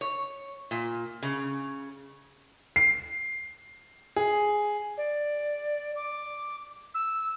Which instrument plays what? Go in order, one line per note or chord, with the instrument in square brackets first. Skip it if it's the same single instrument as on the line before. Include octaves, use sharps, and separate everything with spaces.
[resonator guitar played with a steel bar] C#5
A#2
C#3
[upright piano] C7
G#4
[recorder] D5
D6
E6